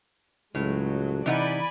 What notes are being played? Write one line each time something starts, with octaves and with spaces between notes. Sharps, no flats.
C#2 A2 F#3 G#3
C3 E3 D#4 D5 F#5 G#5 B5